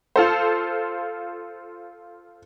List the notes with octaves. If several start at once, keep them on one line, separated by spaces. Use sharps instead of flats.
F4 A4 C5